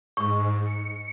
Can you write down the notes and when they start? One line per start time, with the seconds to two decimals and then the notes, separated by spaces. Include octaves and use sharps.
0.17 G#2 C#6
0.65 C#7